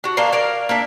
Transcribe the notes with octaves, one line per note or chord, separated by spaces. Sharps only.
D4 F#4
A#3 D4 F5
A#4 D5 F5
A#3 D4 E5